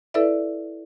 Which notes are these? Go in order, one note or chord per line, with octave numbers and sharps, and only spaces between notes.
E4 A4 B4 D5 E5